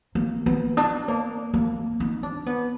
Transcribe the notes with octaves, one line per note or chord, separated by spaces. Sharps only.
A#3
B3
D4
A#3
A#3
D#4
D4
B3